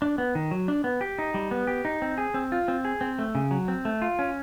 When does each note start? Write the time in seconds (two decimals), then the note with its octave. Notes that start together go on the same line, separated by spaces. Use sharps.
0.02 D4
0.18 B3
0.35 D#3
0.51 F#3
0.68 D4
0.84 B3
1.01 G4
1.19 D#4
1.34 G3
1.51 B3
1.67 G4
1.85 D#4
2.02 C4
2.18 G#4
2.34 C4
2.52 F4
2.68 C4
2.85 G#4
3.01 C4
3.19 A3
3.35 C#3
3.51 F#3
3.68 C4
3.85 A3
4.02 F4
4.19 C#4